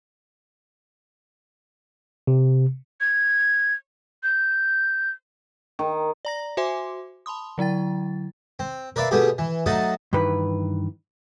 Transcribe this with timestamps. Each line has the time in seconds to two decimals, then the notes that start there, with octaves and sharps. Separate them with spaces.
2.27 C3
3.01 G#6
4.23 G6
5.79 D#3
6.25 D5 A#5 A#6
6.57 F#4 C5 E5 G#5 C6 D6
7.26 A5 B5 C6 D#6
7.58 D3 F#3 E4 G5 A6
8.59 C4
8.96 A#4 B4 D5 E5 F5
9.11 B2 A3 B3 G4 G#4
9.38 E3
9.66 F#3 A3 D#4 D#5 F#5 A5
10.13 G2 D#3 E3 B4